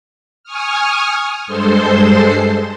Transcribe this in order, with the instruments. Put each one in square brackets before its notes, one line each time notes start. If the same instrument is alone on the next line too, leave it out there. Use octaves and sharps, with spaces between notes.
[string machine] G#5 C#6 D#6 F6
G2 G#3 A4 C5 C6